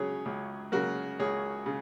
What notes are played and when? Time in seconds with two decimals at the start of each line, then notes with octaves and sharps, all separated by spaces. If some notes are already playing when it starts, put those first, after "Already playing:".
Already playing: C#2 C#3 F#3 G#4 C#5
0.26 C#2
0.72 C#3 F#3 F#4 A#4
1.19 C#2 G#4 C#5
1.66 C#3